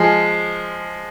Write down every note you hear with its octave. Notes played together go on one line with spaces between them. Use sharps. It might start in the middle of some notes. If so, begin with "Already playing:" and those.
Already playing: F3 G#3